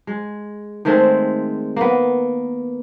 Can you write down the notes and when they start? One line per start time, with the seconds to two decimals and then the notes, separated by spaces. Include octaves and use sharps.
0.07 G#3
0.85 D#3 G#3 A3 C4
1.76 A#3 B3